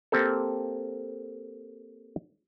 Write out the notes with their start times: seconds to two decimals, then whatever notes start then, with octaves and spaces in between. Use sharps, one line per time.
0.12 A#3 C4 G4 A4